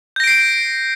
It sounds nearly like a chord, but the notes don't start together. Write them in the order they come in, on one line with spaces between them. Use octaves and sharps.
G6 A#6 D7 C7